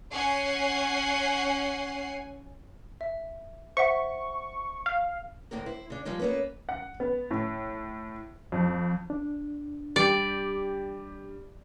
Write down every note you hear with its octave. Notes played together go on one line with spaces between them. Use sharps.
C#4 F#5 G#5 C7
E5
C5 E5 F#5 C#6
F5
D2 A2 A#3 A#4
E4 C5
C#3 D4
F3 G3 G#3 D#4
A#3 B3 C#4 D#4 B4
F#5
B3
A2
F2
D4
G3 G4 D5